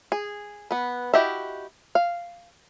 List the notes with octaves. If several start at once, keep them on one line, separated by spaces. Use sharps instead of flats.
G#4
B3 B4
E4 F#4 G4 D#5 E5
F5